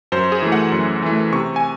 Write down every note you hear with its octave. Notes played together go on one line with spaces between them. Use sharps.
F#2 C5
G#4
E3 A3
F#5
F#2
E3 A3
C3 C#6
G#5